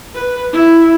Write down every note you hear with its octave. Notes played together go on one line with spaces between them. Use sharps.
B4
E4